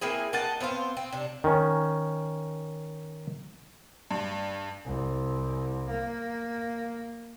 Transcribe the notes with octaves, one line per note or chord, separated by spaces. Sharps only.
A#3 C4 E4 G#4
A#3 D#5 F#5 A5
B3 C4 C5 F5
C4
C3 D4
D#3 C#4
G2
C2
A#3